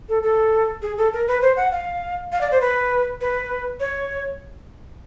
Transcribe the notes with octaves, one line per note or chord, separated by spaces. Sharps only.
A4
A4
G#4
A4
A#4
B4
C5
F#5
F5
F5
D5
C5
B4
B4
C#5